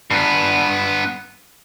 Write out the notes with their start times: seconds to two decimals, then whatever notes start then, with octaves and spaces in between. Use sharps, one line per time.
0.10 G2 B3